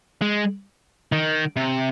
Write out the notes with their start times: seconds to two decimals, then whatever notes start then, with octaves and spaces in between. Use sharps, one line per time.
0.22 G#3
1.12 D#3
1.57 C3